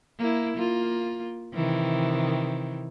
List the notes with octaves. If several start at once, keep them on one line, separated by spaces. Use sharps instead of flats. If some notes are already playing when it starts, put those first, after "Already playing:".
A#3 E4
A#3 F4
C3 D#3 E3